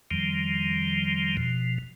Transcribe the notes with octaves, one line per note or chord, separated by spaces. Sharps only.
F2 D#3 F3 G3
B2 F3